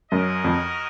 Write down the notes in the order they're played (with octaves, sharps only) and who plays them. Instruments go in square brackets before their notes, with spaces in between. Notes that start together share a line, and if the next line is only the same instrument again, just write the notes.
[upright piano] F#2 [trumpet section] C#4 F#4 A#4 D#5
[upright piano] F2